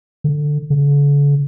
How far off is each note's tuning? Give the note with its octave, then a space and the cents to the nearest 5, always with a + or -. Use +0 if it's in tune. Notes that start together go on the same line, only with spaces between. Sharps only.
D3 +10
D3 -45